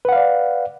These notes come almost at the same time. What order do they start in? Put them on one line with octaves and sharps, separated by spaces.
B4 F#5 F5 D5